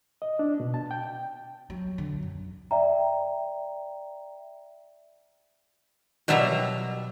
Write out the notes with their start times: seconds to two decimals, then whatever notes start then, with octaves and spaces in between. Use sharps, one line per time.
0.22 D#5
0.39 D4
0.60 B2
0.74 A5
0.91 G5
1.70 F#3
1.98 D3
2.23 F#2
2.71 D5 E5 G5 A#5
6.28 B2 F#3 G3 E5 A#5